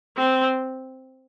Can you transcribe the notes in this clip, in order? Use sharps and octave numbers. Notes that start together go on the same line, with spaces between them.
C4